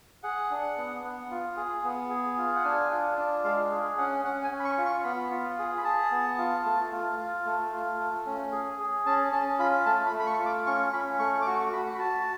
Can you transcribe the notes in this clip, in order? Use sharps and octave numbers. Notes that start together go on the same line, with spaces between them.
G#4 F#5
D4
B3
B3
F4
G#4
B3
G#4
F4
F#5
D4 G#5
F4
D4
G#3 F5
G#4
C#4 F#5
C#4 F#5
G#5
C#4
B5
C#6
F4
C#6
B3 B5
F4
G#4
B5
G#4 A5
B3
F4
A3
F4
F4
A3
F4
A3
C#4
G#4
G#4
C#4 A5
C#4 A5
F4 B5
A3 A5
B5
A3
B5
C#6
F4
D6
C#4 C#6
C#4 B5
A3 C#6
D6
F#4 C#6
F#4 B5
B5
F#4 A5